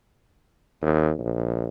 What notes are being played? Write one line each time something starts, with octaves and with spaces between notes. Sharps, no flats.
D#2
A#1